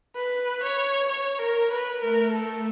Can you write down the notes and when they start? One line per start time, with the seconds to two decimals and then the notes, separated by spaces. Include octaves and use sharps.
0.16 B4
0.62 C#5
1.09 C#5
1.39 A#4
1.71 B4
2.01 A3 A#4
2.32 A4